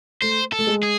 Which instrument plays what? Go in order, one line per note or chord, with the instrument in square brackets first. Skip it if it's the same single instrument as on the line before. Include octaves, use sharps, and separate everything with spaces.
[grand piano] A3 [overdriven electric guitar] C5
[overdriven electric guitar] A4
[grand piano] A3
G#3
[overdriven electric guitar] G#4